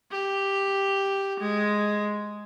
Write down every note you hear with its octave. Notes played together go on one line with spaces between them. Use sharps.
G4
G#3